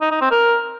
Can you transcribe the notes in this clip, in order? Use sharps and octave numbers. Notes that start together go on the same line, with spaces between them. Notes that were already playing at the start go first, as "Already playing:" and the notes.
D#4
D#4
C4
A#4